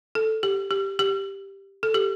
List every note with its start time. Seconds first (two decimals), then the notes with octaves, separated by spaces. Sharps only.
0.15 A4
0.43 G4
0.71 G4
0.99 G4
1.83 A4
1.94 G4